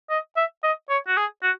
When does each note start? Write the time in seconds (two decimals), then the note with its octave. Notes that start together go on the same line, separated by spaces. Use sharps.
0.10 D#5
0.36 E5
0.64 D#5
0.89 C#5
1.08 F#4
1.17 G#4
1.43 F#4